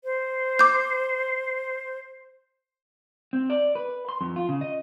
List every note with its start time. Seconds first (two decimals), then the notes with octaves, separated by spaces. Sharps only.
0.04 C5
0.59 D6 G6
3.33 C4
3.50 D5
3.75 B4
4.09 C6
4.21 F2
4.36 F4
4.49 C#3
4.61 D#5